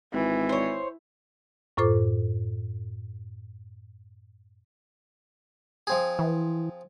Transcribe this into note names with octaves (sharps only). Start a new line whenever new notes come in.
G#1 E3
C5 C#5
F#2 A2 F4 A4 C5 D6
F3 C4 G#4
E3